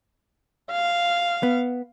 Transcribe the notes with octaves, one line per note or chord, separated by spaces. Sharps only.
F5
B3